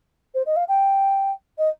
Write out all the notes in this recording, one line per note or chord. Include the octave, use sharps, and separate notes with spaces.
C5
D#5
F5
G5
D#5